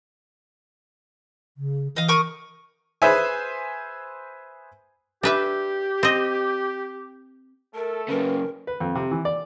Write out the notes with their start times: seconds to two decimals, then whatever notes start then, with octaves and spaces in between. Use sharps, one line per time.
1.57 C#3
1.96 E3 D#5 F5
2.08 A#4 C#6 D#6
3.02 G#4 B4 C5 E5 G#5
5.23 D4 G4 B4 E5
6.03 C4 D#5
7.75 A3 A4 A#4
8.09 F#2 C#3 A#4 B4
8.67 B4
8.80 F2
8.95 C3
9.11 E3
9.25 D5